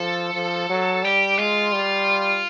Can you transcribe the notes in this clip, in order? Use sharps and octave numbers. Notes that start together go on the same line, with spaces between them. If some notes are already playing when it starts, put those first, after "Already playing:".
Already playing: F3 A4
F3
F#3
G3 G4
G#3 F4
G3